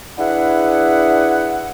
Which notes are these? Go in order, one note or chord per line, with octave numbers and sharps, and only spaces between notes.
D4 E4 G#4 B4 E5 F#5